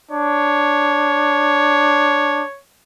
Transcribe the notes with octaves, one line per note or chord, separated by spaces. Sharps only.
D4 C#5